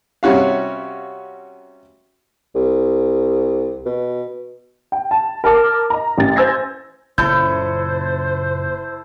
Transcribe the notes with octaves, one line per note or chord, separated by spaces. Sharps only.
C3 G3 C#4 F#4 F5
C2
B2
G5
A5
A#4 A5 D6
D#5 A#5
A1 A6
C5 G#5 E6 G6 G#6 A#6
F#1 A#2 C#3 E4 A4 C5 G6